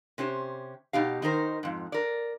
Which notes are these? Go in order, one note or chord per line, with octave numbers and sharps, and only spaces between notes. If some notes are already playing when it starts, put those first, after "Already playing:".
C3 C#4 G4 C5
B2 D#4 G4 F5
D#3 D#4 A#4 C5
F2 G#2
A#4 D5